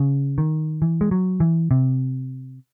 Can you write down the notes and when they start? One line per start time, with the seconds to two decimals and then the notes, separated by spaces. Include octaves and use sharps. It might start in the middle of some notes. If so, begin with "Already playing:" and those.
Already playing: C#3
0.38 D#3
0.82 E3
1.01 G#3
1.11 F#3
1.40 E3
1.71 C3